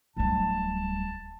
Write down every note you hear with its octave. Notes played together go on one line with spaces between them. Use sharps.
D1 G3 A5